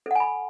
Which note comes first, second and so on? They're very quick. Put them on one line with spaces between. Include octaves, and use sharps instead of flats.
A4 F#5 G#5 B5